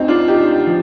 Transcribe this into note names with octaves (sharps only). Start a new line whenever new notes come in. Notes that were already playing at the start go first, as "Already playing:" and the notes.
Already playing: D2 C4 D#4
D4 F4
D#4 G4
F3